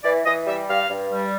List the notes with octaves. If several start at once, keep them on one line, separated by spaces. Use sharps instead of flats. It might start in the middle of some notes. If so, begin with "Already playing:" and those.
E3 D5
E3 D#5
G3 E5
G2 F5
G2
G3